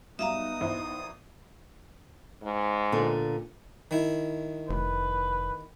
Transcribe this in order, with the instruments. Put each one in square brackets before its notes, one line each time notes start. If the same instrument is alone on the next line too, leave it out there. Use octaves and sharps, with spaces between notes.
[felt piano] F#3 G3 [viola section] B3 D#4 [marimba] E5 F5 A#5 [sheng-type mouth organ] D#6
[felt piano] A#1 E4 C5
[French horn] G#2
[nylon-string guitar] A#2 D3 B3
[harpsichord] D#3 E4
[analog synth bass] F1 [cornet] B4